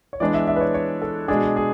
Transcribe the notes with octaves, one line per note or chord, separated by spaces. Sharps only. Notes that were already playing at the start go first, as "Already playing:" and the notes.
C#5
E3 G#3 B3 D4 D5
E5
E5
B4
C#5
C#5
A4
B2 G#3 D4 G#4
G#4